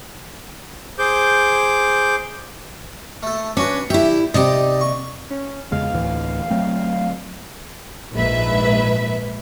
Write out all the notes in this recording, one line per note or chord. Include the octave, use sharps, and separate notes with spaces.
G#4 C5 D6 G6
A3 A4
C#4 D4 F#4 B4
D3 E4 G4 E5
C3 D#4 G4 D5 D#5
C#6
C#4
E2 C#3 G#3 F5
D2 A2 E3
F#3 A3 C4
A#1 G#2 B4 E5